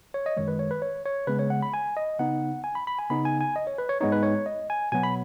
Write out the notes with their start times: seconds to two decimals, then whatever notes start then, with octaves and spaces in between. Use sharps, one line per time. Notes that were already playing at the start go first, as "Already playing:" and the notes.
0.14 C#5
0.26 D#5
0.37 F#2 D#3 G#3 C#5
0.48 B4
0.59 C#5
0.71 B4
0.82 C#5
1.06 C#5
1.27 C#3 G#3 B3 B4
1.39 C#5
1.50 F#5
1.62 B5
1.74 G#5
1.97 D#5
2.19 C#3 B3 D#4 F#5
2.64 G#5
2.75 B5
2.87 B5
2.99 G#5
3.10 C#3 B3 D#4 B5
3.25 G#5
3.41 G#5
3.56 D#5
3.67 C#5
3.78 B4
3.89 C#5
4.01 G#2 G#3 B3 D#4 C#5
4.12 B4
4.23 C#5
4.46 D#5
4.70 G#5
4.92 B2 F#3 B3 G#5
5.03 B5